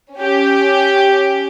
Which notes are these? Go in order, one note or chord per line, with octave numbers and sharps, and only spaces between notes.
C#4 G4